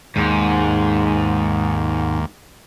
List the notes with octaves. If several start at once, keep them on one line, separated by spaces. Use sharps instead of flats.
D#2 G#2